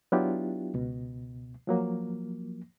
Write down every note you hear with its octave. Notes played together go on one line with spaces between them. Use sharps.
F#3 B3 D4 E4 F4 G4
C#2 B2
F3 F#3 A#3